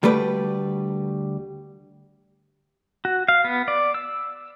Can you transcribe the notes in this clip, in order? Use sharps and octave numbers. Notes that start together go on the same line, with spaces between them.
D2 G3 A3 B4 D5
F#4
F5
B3
D5
E6